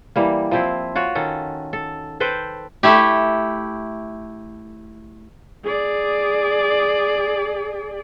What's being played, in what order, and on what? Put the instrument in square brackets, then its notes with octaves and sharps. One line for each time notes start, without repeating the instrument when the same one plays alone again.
[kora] E3 G3 A#3
F3 C4 E4
F4 F#4 C#5
D#3 C#4 A4
A4
A4 B4 C5 G5
[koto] A3 E4 G4
[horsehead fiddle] G#4 D5